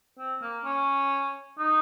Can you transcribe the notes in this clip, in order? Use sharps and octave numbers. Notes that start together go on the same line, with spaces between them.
C4
A#3
C#4
D#4